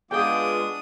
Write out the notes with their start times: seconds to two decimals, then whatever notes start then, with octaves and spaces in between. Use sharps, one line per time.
0.11 G#3 B3 D4 F4 G#4 G5 D6 D#6